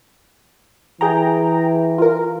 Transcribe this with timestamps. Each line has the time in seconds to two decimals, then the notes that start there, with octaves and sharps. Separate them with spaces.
1.01 E3 G#4 G5 A#5
1.98 F4 A#4